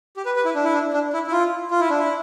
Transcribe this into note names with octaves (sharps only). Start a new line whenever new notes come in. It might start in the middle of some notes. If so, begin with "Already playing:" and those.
G4
B4
B4
E4
D4
E4
D4
D4
E4
E4
F4
F4
E4
D4
E4